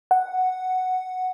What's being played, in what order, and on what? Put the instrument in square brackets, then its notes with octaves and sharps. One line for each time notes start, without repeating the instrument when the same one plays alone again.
[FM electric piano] F#5